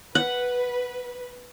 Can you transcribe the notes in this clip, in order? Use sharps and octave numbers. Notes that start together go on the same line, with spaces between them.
B4 F#5